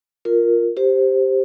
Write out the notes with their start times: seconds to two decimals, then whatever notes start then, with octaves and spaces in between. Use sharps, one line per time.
0.25 F4 A#4
0.77 G4 C5